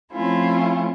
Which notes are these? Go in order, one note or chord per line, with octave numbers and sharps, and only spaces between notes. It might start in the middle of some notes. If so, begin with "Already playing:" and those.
F3 A3 C4 C#4 E4 F4